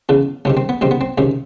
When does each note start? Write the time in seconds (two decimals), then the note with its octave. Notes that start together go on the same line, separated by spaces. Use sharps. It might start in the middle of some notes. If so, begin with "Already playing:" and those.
0.09 E2 C#3 E3
0.45 C#2 C3 D#3 C#4
0.57 C4
0.69 B3
0.81 C#2 C3 D#3 C4
0.91 B3
1.01 C4
1.18 C#2 C3 D#3 C#4